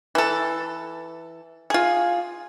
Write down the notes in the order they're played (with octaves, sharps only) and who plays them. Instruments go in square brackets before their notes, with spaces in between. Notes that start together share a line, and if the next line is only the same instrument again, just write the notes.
[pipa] E3 A4
F4 G#4